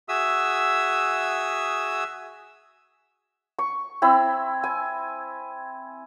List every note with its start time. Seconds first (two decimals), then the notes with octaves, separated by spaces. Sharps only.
0.09 F#4 G#4 E5 D#6 E6
3.59 C#6
4.02 C4 E4 B5
4.64 G#5